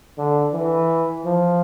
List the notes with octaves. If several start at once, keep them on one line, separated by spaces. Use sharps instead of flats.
D3
E3
F3